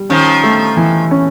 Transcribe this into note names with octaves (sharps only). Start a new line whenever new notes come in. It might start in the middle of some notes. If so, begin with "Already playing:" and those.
Already playing: G3
D#3 F3 C#4
A3
E3
C#4